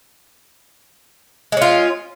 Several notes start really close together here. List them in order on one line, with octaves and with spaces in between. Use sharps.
G#3 C#4 F4